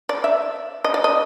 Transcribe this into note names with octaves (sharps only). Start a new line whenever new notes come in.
D5
E5
D#5
D5
D#5